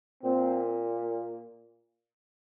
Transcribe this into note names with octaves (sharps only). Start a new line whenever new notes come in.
A#2 A#3 C4